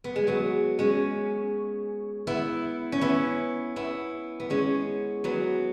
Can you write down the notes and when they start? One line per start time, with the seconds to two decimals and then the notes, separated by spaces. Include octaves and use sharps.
0.04 B3
0.16 G#3
0.27 F#3 B3
0.79 G#3 C#4
2.27 B3 E4
2.92 C#4
3.01 B3 E4
3.76 B3 E4
4.40 B3
4.50 G#3 C#4
5.24 F#3 B3